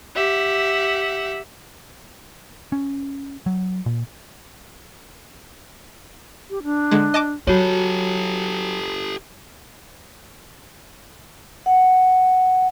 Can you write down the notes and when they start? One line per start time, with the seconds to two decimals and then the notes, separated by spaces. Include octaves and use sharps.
0.14 G4 E5 F#5
2.72 C#4
3.46 F#3
3.86 A#2
6.50 G4
6.63 D4
6.91 D3 G#3
7.14 D#5 A5 D6
7.47 F#3 F#4 G4 A4 C#5
11.66 F#5